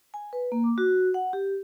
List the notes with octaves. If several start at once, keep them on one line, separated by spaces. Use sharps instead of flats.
G#5
B4
A#3
D6
F#4
F#5
G4